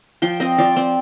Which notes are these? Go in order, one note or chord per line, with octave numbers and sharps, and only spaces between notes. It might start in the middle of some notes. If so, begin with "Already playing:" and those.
F3 G5
C4 D#5
F3 D5
C4